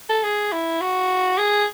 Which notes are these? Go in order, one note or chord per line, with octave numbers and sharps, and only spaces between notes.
A4
G#4
E4
F#4
G#4